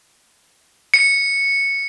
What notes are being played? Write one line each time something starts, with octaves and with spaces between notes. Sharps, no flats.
C#7